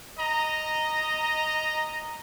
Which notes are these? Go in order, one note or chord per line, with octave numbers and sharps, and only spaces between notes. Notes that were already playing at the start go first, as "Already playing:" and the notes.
D#5 A#5